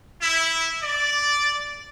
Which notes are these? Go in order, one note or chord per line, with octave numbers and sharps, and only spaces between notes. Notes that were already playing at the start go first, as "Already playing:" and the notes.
E4
D5